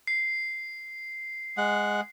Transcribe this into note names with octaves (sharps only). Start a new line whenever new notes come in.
C7
G#3 F#5